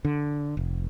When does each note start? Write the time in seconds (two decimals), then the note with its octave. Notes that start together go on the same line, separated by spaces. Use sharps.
0.05 D3
0.57 F1